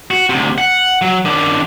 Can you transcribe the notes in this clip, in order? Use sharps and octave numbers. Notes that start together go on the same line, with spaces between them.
F#4
D2 C3
F#5
F#3
D#3 D4